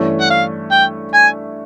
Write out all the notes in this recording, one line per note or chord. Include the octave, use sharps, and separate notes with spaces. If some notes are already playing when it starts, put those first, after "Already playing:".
Already playing: G2 E3 A3 C#4
F#5
F5
G5
G#5